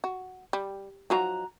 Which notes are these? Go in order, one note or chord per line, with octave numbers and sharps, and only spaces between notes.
F#4
G3
F3 F#3 D#4 F#4 A#5